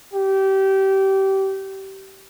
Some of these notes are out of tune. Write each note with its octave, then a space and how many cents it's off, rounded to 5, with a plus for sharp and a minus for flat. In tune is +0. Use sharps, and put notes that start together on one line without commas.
G4 -25